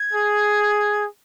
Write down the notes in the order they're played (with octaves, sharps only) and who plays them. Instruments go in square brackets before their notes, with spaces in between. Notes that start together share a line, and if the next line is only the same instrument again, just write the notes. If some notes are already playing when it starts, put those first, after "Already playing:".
Already playing: [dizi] G#6
[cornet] G#4